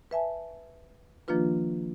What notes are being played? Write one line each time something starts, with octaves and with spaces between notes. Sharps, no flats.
B4 E5 G#5 A5
D#3 F3 A#3 D4 F4 B4